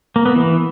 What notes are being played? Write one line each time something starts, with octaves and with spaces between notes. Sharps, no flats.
A#3
B3
E3